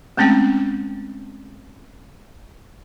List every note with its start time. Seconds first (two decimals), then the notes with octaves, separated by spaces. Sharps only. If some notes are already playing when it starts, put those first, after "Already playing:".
0.17 G#3 A3 C4 C#4 G5